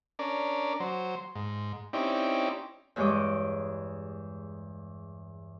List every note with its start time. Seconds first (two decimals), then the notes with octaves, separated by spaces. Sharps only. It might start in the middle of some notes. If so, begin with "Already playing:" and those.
0.19 C#4 D4 A#4 D5
0.80 F#3 C5
1.35 G#2
1.93 C4 C#4 D#4 E4 G4 D5
2.96 E2 G2 G#3 C#5 D#5 D6